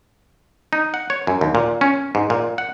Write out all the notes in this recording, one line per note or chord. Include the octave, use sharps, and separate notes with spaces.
D#4
F#5
C#5
F#2
D#2
A#2
C#4
G#2
A#2
F#5